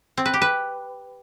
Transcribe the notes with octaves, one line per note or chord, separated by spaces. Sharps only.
C4
B4
G4
B4